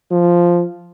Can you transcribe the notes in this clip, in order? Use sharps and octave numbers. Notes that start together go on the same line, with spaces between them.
F3